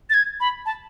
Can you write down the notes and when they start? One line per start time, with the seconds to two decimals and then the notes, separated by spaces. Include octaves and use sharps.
0.10 A6
0.14 G#6
0.40 B5
0.66 A5